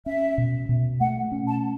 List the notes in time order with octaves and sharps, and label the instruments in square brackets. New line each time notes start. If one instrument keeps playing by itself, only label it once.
[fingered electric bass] C#4 [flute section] E5
[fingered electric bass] B2
B2
[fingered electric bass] A3 [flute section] F#5
[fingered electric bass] C#4
[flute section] A5